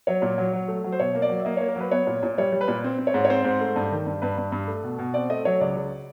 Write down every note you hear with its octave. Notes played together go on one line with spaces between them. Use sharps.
F#3 C#5
A#2
F#3
F#3
A3
F#3
C5
B2 C#5
A#3
D5
F#3
E5
A#3 D#5
C#5
A#3
A#4
F#3 B4
B3 C#5
A#2
A#2
G3 C#5
G3
B4
A#2
C4
C4
C#5
G#2
C#5
C4 C5
G#2
A3
G2
D#3
G2
G2 B4
G2
G2
A3
B2
B2
C4 D5
A3 D#5
F#3 C#5
C#2 D5
C#2